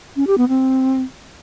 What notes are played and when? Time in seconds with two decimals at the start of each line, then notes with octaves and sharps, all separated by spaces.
0.16 C#4
0.27 G4
0.38 B3
0.48 C4